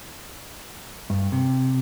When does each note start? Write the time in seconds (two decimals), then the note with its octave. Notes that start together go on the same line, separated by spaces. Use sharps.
1.10 G2
1.32 C3